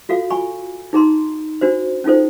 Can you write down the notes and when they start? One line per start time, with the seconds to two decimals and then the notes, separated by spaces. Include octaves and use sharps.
0.09 F4 F#4 A4 F5
0.30 G#5 B5 C#6
0.93 D#4 G#4 A#5 C6
1.61 D4 F#4 C5
2.04 C#4 D#4 F4 A4 C5